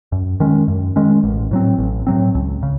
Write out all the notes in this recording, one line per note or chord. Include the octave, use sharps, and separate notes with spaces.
F#2
D#3 G#3 C#4
F#2
D#3 G#3 C#4
A1
A2 F#3 C4
A1
A2 F#3 C4
C#2
C#3